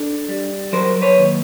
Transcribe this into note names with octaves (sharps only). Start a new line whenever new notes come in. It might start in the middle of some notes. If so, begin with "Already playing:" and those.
Already playing: D4 A4
G3
F#3 A#4 C5
B4 C#5
D#2